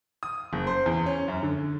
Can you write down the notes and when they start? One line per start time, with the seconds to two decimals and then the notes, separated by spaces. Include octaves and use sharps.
0.23 D#6
0.53 F#1
0.67 C5
0.86 E2
1.06 C#4
1.28 F#2
1.43 D3